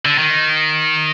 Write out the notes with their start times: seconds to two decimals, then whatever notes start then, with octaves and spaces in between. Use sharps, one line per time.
0.05 D3
0.18 D#3